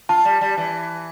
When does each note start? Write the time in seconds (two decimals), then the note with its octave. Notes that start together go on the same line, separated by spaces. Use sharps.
0.09 F4 A5
0.25 G3
0.41 G3
0.57 E3